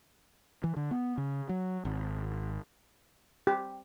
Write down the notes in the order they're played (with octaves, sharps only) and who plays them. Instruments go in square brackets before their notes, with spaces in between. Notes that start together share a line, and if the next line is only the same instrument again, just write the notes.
[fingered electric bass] E3
D3
B3
C#3
F#3
G#1
[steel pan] G4